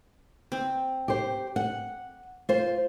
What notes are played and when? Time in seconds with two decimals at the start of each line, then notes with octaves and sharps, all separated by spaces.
0.52 C4
1.08 G4 C5
1.56 F#5
2.49 F4 C5